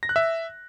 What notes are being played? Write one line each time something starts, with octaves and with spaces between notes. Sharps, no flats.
A#6
F#6
E5